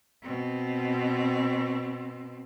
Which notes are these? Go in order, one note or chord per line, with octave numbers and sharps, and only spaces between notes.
B2 C4